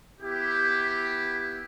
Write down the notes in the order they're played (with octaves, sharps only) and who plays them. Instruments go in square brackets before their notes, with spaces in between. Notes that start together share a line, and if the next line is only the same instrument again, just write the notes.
[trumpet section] B3 E4 G4